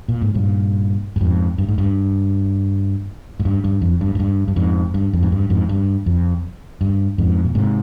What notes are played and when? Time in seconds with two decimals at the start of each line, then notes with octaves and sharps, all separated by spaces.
0.08 A#2
0.22 G#2
0.34 G2 A#2
1.16 G2
1.21 F2 G#2
1.58 G2
1.68 G#2
1.78 G2
3.40 G#2
3.45 G2
3.64 G2
3.82 F2
4.01 G2
4.15 G#2
4.20 G2
4.48 G2
4.56 F2 G#2
4.94 G2
5.13 F2
5.22 G#2
5.32 G2
5.50 F2 G#2
5.69 G2
6.06 F2
6.81 G2
7.18 F2 G#2
7.45 A#2
7.55 G#2 C3